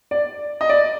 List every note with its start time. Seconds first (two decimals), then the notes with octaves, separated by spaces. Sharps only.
0.11 D5
0.61 D#5
0.69 D5